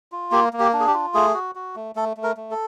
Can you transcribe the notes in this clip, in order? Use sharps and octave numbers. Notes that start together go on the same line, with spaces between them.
F4
A#3 G4
A#3
G4
D4
G#4
G4
F4
A3 G#4
F#4
F#4
A3
A3 A4
A3
A#4
A3
A4